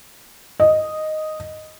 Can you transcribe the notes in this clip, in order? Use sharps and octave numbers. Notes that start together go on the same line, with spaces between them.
D#5